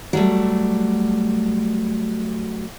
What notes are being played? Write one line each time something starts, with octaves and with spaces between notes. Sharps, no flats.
F#3 G3 A3